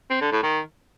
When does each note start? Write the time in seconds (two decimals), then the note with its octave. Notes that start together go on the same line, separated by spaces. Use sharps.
0.10 C4
0.21 D3
0.32 A2
0.43 D#3